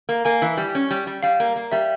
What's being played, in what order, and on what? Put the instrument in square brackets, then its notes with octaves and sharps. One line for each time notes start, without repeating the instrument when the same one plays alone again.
[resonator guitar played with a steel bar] A#3
[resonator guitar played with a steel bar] A#3 [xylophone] G#5
[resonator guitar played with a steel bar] E3
G3
C#4
G3
G3
[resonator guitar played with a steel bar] G3 [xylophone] F5
[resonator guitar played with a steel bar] A#3
A#3
[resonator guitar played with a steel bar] G3 [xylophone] E5